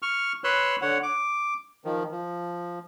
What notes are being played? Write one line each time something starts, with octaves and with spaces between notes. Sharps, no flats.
C#6 F6
B4 C#5 C6 E6 F#6
D3 C#5 F#5
D6
D#3 F3
F3